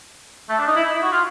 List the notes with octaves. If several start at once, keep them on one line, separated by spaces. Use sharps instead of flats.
A3
D4
D#4
E4
D#4
E4
F#4
F4